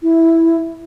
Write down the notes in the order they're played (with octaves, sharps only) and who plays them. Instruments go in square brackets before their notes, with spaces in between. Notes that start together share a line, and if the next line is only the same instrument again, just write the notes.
[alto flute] E4